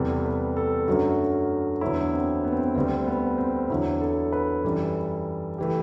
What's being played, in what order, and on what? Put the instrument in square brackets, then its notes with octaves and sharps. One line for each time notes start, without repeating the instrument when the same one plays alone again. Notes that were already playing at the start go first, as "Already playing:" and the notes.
Already playing: [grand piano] E2 C3 G3 A4
B4
A4
F#2 D3 F#3 A3 F#4
E2 D3 F#3 E4
C4
B3
C4
B3
D2 D3 G3 C4
B3
C4
E2 D3 F#3 E4
A4
B4
F#2 E3 G3 A4
E3 A3 G4